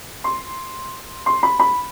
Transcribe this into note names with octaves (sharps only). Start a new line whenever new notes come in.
C6
C6
B5
B5